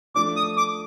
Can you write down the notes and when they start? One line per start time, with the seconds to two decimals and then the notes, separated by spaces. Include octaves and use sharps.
0.16 F3 A3 D4 D6
0.36 D#6
0.57 D6